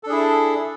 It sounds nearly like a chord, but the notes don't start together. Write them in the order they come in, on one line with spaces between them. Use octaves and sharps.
A4 D4 G#4 E4